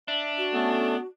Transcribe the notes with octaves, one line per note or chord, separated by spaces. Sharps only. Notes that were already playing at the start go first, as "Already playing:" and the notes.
D4 E5
F#4
A3 B3 C#4 A4